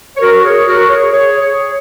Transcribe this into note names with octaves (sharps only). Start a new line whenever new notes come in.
C#5
F#4 A#4
G#4 C#5
F#4 A#4
G#4 C#5
G#4 C#5
G#4 C#5